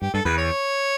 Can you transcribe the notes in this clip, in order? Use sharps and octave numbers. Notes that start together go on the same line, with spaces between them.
G2 G4
G2 A4
E2 B4
C#5